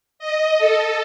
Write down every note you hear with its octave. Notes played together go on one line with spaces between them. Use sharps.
D#5
A4